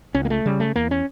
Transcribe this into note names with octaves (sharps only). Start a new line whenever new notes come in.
C#2 C#4
A#3
A3
C#3 G3
A3
E2 A#3
C#4